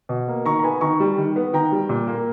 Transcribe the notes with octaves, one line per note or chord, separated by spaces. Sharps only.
B2
A#3
D#3 A#5 C#6
A#5
B3 G#5 B5
D#3 A#5 C#6
G3
D#3
B3
D#3 G5 A#5
G3
A#2
A#3